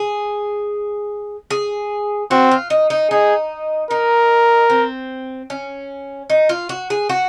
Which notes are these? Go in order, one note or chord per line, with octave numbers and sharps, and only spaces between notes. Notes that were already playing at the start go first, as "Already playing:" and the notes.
Already playing: G#4
G#4
C4 F#4
F4
D#4
D#4
D#4 G#4
D#4 A#4
C4
C#4
D#4
F4
F#4
G#4
F#4